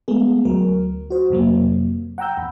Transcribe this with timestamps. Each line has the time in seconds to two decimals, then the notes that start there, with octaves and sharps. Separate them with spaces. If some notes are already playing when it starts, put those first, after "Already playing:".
0.08 G#3 A3 B3 G#4
0.45 D2 F#3 A#4
1.10 F#4 C5
1.30 F2 C3 F#3 A#3
2.18 F#5 G5 A#5 E6 G6
2.37 E2 B5